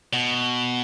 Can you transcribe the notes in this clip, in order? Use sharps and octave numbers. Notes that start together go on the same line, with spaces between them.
B2